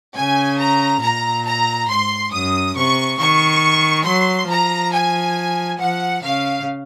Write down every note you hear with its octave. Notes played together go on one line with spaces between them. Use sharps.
C#3 G#5
A#5
A#2 A#5
A#5
G#2 C6
F#2 D#6
C3 C#6
D#3 C#6
F#3 C6
F3 A#5
G#5
F3 F#5
C#3 F5